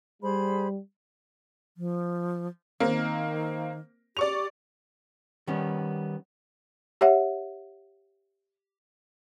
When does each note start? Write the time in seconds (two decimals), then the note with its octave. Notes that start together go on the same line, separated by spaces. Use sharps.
0.22 G3 G#4 C5 B5
1.77 F3
2.80 D#3 A#3 C4
4.17 G4 D5 C#6 F7
5.47 D#3 G3 B3 C#4
7.01 G4 C#5 E5 F#5